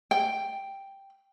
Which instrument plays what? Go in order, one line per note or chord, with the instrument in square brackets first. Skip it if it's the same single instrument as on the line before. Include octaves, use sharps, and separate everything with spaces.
[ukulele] G5